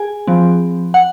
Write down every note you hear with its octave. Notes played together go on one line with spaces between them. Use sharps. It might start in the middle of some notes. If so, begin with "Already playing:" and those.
Already playing: G#4 G#5
F3 C4
F#5